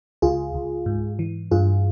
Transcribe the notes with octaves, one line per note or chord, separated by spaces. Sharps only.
C#2 F4 G#4
C#2
G#2
E3
G2 F4 G#4